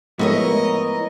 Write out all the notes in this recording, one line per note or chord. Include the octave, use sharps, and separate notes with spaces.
F3 G#3 A3 B3 E4 A#4 C#5 D#5